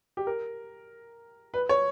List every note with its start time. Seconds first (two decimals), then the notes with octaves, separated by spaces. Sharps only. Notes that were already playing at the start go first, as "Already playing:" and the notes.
0.17 G4
0.27 A#4
1.54 B4
1.69 C#5